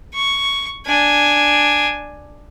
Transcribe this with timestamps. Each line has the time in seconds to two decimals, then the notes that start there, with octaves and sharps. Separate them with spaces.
0.14 C#6
0.86 D4 G#5